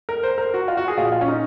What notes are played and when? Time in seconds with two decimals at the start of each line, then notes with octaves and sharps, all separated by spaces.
0.09 A#4
0.23 C5
0.38 A#4
0.54 F#4
0.68 F4
0.77 F#4
0.88 G#4
0.97 A#2 F3 F4
1.12 F4
1.21 C#4
1.28 D#4